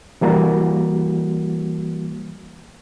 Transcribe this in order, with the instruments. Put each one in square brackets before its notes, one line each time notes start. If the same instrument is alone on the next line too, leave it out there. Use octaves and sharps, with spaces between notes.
[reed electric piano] E3 G3 A#3 F#4